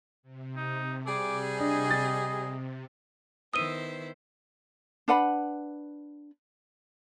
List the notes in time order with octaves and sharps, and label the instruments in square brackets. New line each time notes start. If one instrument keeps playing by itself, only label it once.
[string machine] C3
[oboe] D#4
[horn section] G3 G#4 [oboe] D6
[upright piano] D4 [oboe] D#5
[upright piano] A6
[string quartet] D#3 E4 C5 [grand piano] B3 E6 G7 [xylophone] D#6 D#7
[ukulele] D4 B4 F#5 B5